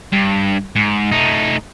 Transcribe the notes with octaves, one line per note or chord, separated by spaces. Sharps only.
G2
G#2
A3 D#4